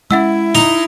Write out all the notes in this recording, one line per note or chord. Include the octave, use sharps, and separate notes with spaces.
G#3 B3 C#4 E4 E5 F#5 E6
D#4 D#5 A#5